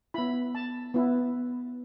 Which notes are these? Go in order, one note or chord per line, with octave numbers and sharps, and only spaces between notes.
B3 E4 B5
A5
B3 E4